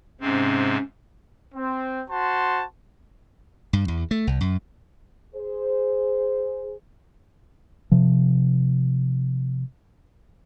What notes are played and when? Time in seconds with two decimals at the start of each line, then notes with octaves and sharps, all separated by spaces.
0.21 G#2 C3 C4 C#4
1.55 C4
2.10 F#4 C5 A5 C6
3.73 G2
3.88 E2
4.11 A3
4.27 C2
4.41 F#2
5.35 G#4 C5
7.91 C3 F3